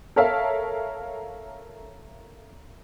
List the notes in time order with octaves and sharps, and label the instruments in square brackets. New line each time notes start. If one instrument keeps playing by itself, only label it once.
[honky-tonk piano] A4 A#4 C#5 E5 F5